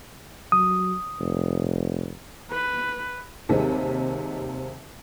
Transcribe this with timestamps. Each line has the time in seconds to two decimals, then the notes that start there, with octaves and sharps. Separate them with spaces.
0.52 F#3 D#6
1.19 F1
2.51 B4
3.49 D#2 C3 D#3 G3 G#3 C4